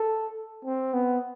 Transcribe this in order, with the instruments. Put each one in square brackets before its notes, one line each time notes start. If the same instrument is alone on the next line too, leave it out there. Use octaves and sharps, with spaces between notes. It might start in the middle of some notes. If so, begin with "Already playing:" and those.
Already playing: [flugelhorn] A4
C4
B3